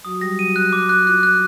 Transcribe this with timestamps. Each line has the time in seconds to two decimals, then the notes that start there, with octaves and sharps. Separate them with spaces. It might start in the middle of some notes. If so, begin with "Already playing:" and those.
0.05 F#3 F#4 D#6
0.21 G3 G4 A#6
0.38 F#3 F#4 D#7
0.56 F#6
0.73 D6
0.89 F#6
1.06 F4 F#6
1.23 F#6